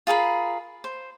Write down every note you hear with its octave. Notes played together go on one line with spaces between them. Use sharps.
F4 G#4 A#4 B5
C5